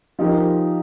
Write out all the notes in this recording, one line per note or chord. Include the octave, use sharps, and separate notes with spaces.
F3 D#4 G4 A#4